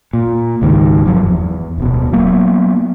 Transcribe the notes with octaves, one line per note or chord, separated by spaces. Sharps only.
A#2
C#2 G#2 D#3
F#1 G2 F3 F#3
E2
D1 B2
F#3 A#3 B3